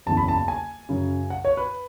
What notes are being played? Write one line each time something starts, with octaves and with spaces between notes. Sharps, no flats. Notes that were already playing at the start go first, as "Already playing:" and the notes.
F#1 E2 C#3 A5
B5
A5
G#5
F#2 C#3 F#3
F#5
C#5
B4